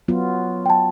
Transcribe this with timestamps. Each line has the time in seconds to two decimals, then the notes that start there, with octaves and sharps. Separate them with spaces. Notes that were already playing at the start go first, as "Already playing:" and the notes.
0.08 F#3 B3 F4
0.66 G5 A5